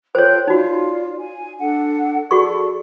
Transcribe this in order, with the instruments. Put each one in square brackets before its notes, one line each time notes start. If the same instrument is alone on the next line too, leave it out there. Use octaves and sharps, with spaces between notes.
[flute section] F4 A4 G5 [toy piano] C5 C#5
[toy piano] D#4 F#4 [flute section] F4 D5
[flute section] G#5
D4 A4 F#5
[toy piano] F#4 G#4 C#6 [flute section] A4 D5